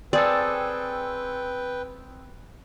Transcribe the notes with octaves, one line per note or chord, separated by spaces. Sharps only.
C4 G#4 A4 B4 D5 G5